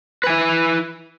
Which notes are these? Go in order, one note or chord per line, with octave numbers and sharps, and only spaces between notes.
E4 B4 G#5